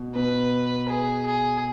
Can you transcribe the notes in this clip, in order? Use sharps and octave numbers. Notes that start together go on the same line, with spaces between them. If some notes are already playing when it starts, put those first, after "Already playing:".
Already playing: B2
B2 B4
G#4
G#4